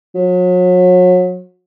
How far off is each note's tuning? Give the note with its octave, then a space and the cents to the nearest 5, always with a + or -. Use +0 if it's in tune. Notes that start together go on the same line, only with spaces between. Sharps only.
F#3 -35